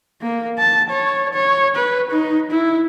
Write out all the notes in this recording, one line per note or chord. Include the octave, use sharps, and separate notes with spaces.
A#3
A5
C#5
C#5
B4
D#4
E4